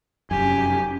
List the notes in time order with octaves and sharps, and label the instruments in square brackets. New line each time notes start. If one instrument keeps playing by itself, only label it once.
[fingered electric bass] F1 F#2 [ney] C#4 [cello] G4 [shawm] G#5